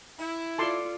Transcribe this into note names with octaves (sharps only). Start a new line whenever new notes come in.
E4
F4 A4 D5 A5 C6 D6